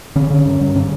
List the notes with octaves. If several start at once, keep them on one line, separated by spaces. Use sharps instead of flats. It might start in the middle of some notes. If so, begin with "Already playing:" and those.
D3 C#4
D3
G2
G2
D3 C#4